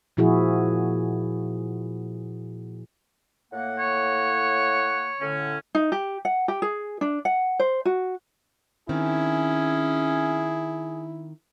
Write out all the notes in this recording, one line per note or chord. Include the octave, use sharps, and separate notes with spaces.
A#2 F3 E4 F#4 G#4
A2 A#3 F#5
C#5
A2 D3 C#4
D#4
G4
F#5
G4
G#4
D4
F#5
C5
F#4
D#3 C4 C#4 E4 G#4